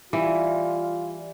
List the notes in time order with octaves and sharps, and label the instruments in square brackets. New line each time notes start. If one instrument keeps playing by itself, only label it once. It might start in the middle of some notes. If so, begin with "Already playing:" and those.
[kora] E3 [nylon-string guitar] G3 [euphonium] F4